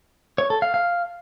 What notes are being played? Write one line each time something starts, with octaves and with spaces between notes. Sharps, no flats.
C#5
A4
F5
F5